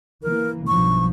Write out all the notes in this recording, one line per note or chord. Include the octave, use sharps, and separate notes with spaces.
E3 A#3 A#4
B1 G2 F3 C#6